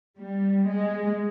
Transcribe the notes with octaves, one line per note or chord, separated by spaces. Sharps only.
G3
G#3